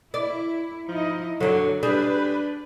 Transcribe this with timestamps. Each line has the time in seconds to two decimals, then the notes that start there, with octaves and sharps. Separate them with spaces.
0.14 E4 D5
0.89 F3 D#4 E4 D#5
1.40 F#2 D3 F#3 D4
1.83 G3 D4 G#4 B4